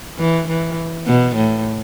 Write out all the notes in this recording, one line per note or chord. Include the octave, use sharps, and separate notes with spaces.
E3
E3
B2
A2